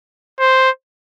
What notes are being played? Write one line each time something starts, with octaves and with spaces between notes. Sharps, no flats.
C5